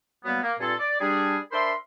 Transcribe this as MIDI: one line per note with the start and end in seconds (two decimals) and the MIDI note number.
0.25 0.41 54
0.25 0.41 55
0.25 0.41 58
0.25 0.41 59
0.42 0.54 58
0.60 0.74 43
0.60 0.74 46
0.60 0.74 60
0.60 0.74 65
0.60 0.74 68
0.60 0.74 69
0.80 0.98 74
1.01 1.37 55
1.01 1.37 62
1.01 1.37 68
1.52 1.72 62
1.52 1.72 70
1.52 1.72 72
1.52 1.72 76
1.52 1.72 83
1.52 1.72 84